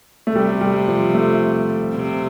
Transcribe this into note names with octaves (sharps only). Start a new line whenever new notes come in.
A3
C3 G3
G3
F3
A3
C3